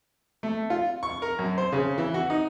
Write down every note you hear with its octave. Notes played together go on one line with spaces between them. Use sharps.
A3
F4
C#6
A#4
F#2
C5
C#3
E3
F#4
D#4